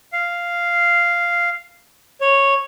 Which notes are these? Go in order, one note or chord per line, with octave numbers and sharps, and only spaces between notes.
F5
C#5